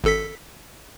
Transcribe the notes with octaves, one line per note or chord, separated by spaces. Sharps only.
G#1 A4 B6